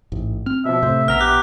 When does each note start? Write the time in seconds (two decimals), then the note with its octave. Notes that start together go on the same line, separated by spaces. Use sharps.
0.12 A1 G#2
0.46 C4 F6
0.65 B2 F3 E5
0.83 A2 C3 C5
1.08 A#1 B3 A#5 F6 B6
1.21 G4 F#6